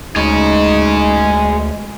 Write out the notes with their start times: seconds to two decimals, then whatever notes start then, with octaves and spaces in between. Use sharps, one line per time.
0.16 D2 G#3 D#4 G#4 C#5